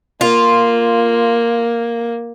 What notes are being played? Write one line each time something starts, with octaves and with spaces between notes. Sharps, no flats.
A#3 F4